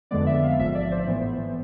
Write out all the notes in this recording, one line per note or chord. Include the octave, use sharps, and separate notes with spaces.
F2 D3 G#3 B3 D5
E5
F5
A1 G#2 F3 E5
D5
C5
A1 A2 E3 B3